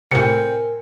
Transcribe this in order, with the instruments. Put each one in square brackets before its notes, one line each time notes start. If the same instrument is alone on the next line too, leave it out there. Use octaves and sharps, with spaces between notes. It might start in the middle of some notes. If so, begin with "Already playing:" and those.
[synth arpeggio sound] A2 C3 [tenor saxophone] C4 [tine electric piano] A#4 G#5 [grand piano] C#7